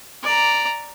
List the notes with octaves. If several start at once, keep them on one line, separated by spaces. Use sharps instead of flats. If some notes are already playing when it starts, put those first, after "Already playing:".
D5 A#5